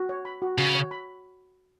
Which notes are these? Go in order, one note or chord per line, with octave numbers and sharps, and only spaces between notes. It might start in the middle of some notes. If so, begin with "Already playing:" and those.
Already playing: F#4
C#5
B5
F#4
C#3 F#4
C#5
B5